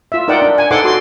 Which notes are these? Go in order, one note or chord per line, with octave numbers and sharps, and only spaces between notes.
F4 E5
D#4 A#4 D5 F#5 G5
D4
G#5
D#4 A4 C5 F#5 C6 D6
F#4 C6 D6